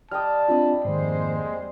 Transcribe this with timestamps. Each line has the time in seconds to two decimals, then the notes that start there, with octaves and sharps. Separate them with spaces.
0.11 G3 D#5 G5 A5 D#6 F6
0.48 C4 D4 F4 D#5 E5 B5
0.85 F2 G#2 D#3 G#3 A#3 C5